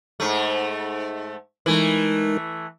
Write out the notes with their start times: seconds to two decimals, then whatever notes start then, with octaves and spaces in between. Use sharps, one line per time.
0.20 G#2 A3
1.66 E3 G#3 A3 D#4 A#4